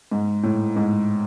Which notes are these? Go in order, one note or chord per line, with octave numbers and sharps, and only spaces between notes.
G#2
A2
G#2